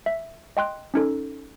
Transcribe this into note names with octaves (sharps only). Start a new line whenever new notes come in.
E5
D#5 G5 C6 F#6
C#4 D#4 A4